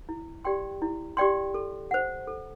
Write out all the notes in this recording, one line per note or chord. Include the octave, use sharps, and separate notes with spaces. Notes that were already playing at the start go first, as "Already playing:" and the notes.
E4
G4 D5 G5 C6
E4
G4 D5 G5 C6
A4
C5 F#5
A4